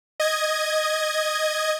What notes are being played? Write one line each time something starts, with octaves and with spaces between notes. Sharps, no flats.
D#5 G#6